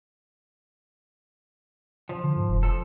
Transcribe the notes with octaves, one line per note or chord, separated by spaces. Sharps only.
F3
D3
G#2
F1
F3 A4